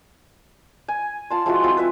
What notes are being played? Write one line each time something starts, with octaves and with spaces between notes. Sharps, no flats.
G#5
F4 A5 C6
F3 G#3 E4 F#4
C4 F4 G#4
B4 E5